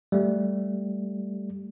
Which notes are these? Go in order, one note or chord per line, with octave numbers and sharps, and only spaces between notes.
G3 A3